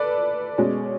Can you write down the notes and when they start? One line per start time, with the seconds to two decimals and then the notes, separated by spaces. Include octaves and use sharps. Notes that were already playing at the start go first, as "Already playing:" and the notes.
Already playing: A4 B4 D5
0.58 B2 G#3 C#4